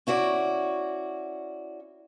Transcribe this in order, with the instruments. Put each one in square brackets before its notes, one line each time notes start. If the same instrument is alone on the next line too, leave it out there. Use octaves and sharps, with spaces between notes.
[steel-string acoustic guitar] C#4 E4 F#4 D5